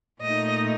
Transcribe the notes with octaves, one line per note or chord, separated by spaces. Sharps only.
A#2 A3 D#4 D#5